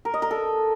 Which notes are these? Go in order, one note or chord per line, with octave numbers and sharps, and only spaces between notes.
A#4
D#5
A#4
A4